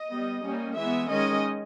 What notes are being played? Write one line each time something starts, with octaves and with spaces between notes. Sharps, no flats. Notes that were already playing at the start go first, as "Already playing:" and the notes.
Already playing: D#5
G3 B3
G3 A#3 C#4
E3 G#3 B3 E5
D#3 G#3 C#4 D#5